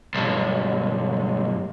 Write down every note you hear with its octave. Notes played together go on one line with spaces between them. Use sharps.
B1 G2